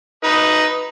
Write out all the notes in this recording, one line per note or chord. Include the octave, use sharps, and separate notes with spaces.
D#4 B4